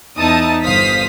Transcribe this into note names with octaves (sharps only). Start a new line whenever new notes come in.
E2 D#4 E4 A5 D#6
G1 C5 F5 D#6 B6